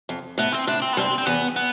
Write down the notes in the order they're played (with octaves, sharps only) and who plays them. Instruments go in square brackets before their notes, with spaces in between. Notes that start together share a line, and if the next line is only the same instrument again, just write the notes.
[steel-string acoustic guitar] F2
[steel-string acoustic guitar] A2 [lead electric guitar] B3
[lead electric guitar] C4
[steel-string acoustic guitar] A2 [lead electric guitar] D4
[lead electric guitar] C4
B3
[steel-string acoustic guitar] G2 [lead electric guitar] C4
[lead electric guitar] C4
[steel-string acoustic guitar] E2 [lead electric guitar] B3
[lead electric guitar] B3